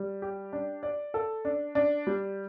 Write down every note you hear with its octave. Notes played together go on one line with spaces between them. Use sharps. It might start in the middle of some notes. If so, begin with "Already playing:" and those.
Already playing: G3
G4
D4
D5
A4
D4
D4
G3